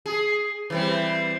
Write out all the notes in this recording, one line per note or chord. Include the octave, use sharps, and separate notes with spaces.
G#4
E3 G3 C4